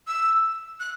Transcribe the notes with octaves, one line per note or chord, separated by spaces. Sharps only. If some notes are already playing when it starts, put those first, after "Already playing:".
E6
F#6